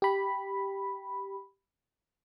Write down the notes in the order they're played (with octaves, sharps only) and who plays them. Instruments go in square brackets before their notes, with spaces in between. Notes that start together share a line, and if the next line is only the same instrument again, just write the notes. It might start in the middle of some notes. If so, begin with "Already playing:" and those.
[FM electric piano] G4 B5